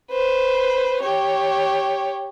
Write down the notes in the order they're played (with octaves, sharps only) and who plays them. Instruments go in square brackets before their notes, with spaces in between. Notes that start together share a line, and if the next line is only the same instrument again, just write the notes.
[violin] B4 C5
G4 C#5